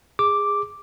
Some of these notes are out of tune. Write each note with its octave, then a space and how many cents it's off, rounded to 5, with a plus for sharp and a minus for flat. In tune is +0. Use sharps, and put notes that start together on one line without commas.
G#4 -15 D6 +0